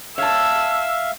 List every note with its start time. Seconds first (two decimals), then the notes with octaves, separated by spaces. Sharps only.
0.18 C#5 E5 F5 A5 E6